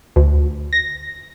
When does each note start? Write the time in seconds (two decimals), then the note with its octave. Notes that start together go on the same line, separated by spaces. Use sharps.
0.16 D2
0.73 A#6